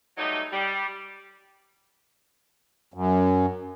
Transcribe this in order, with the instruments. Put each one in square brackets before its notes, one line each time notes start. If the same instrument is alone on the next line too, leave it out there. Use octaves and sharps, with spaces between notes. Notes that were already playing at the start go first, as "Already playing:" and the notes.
[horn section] F#3 G3 A3 D#4
G3
[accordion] F#2